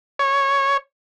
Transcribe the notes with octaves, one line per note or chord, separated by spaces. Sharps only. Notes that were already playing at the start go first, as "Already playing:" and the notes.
C#5